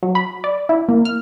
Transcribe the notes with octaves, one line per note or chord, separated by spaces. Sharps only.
F#3
B5
D5
E4
A#3
F6